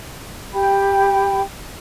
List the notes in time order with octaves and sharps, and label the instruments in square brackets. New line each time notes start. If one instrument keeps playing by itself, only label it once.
[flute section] G4 G5 B5